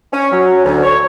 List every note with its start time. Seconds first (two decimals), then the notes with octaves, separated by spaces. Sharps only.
0.13 C#4
0.32 F#3
0.65 D2
0.83 C#5